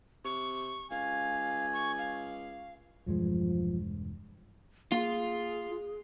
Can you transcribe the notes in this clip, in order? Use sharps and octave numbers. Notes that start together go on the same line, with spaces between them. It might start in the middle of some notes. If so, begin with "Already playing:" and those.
C3 C#6
C#2 F5 G#5
C#6
F5
E1 G2 F3 G#3
A#3 F4 G#4